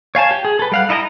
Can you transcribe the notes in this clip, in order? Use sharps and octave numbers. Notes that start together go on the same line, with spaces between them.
C#5 F5 G#5 A5
G4
G#4
A4 B4
G3 F5 F#5
D#4 E4 D#5 G#5 A#5